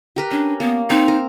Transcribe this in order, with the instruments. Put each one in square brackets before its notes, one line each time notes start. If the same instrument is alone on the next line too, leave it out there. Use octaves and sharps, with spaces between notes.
[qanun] G4 A#4 B4
[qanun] C#4 [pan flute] D4
[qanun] A#3 [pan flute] B3
[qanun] C4 [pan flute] D#4
[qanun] A#4